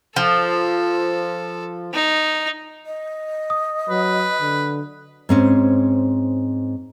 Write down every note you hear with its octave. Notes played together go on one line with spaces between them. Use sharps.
F3 A4
D#4
D#5
D#6
F#3 B4
D3
G#2 C4 C#4